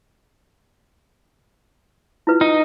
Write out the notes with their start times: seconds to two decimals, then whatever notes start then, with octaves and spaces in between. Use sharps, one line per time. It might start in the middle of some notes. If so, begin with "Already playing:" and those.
2.27 E4 F4 B4
2.41 D#4 G5